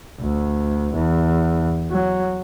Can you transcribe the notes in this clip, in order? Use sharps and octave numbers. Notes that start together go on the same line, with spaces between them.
D2
E2
F#3